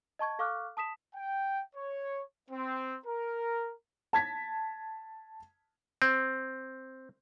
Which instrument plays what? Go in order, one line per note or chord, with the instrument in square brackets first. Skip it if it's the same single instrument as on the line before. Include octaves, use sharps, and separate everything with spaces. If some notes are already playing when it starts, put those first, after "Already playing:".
[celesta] D#5 A5 C#6 G#6
A4 F5 C#6 D6 F6 F#6
A5 D#6 B6 E7
[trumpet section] G5
C#5
C4
A#4
[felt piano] A5 G#6 B6
[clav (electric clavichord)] C4